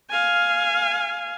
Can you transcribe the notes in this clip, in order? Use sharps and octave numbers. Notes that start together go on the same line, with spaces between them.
F5 G#5